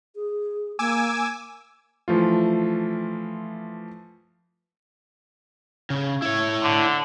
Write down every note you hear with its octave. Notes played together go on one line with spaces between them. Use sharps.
G#4
A#3 G#5 D6 E6
E3 F3 A3 F4
C#3
E4 C#5
D3